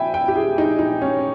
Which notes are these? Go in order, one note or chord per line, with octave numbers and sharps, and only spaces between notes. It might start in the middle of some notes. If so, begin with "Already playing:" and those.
Already playing: E5 G5 G#5 B5
G5
G4
G#4
D#4
D#4
C#4